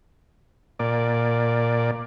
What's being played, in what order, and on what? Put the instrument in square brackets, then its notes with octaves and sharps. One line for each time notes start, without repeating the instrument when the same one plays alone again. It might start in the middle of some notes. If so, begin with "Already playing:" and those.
[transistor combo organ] A#2 D5